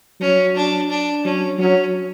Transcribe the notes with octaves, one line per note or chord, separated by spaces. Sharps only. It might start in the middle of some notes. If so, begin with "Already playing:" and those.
F#3 C#4
D4
D4
F#3 C#4
F#3 C#4